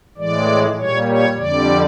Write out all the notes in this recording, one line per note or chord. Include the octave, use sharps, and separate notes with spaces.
A2 E3 G#3 D5
A#2 G3 C#5
C#5
F2 D3 G3 D5